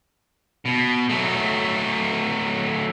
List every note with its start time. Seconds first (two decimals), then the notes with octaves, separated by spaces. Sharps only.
0.66 B2
1.10 F#3 A3